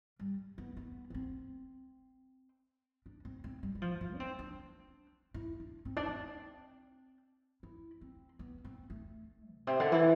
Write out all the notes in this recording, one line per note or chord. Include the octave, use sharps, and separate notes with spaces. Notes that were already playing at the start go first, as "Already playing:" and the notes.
G3
B3
B3
D4
C4
D4
C4
C4
G3
G3
F3
E3
D4
C4
D4
E4
D4
C4
D4
C4
E4
C4
B3
C4
A3
B2
C3
D3
E3